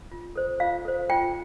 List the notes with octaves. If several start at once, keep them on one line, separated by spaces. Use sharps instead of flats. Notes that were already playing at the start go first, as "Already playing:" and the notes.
F4
A4 C5
F4 F5
A4 C5
F4 G5